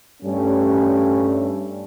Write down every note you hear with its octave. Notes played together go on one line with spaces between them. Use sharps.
G2 G3 A3 C#4